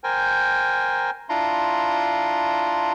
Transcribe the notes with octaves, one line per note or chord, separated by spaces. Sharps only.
A#4 C5 G5 G#5
D4 E4 F4 A#5 C6